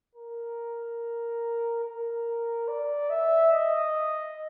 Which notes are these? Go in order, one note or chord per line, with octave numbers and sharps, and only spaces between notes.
A#4
A#4
D5
E5
D#5